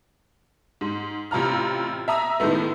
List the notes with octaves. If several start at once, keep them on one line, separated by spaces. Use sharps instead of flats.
G#2
A1 C3 F4 A#5 F6
E5 A#5 D#6 E6
A2 D#3 G#3 A3 B3